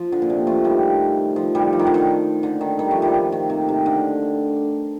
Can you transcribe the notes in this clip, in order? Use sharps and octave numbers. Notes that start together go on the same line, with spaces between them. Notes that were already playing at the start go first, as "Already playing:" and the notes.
Already playing: F3
D3
A#2
C3
F3 A3
D#3 G3
F3
D#3 G3
F3
D#3
D3
D#3
D3
D#3
D#3 G3
F3 A3
D#3 G3
F3
D#3
C3
C3
D3